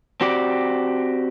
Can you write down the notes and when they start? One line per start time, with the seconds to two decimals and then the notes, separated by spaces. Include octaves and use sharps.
0.21 C4 F#4 G4 D5